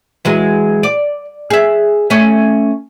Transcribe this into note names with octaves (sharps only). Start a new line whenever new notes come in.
E3 F#3 G#3
D5
G#4 E5
A3 C#4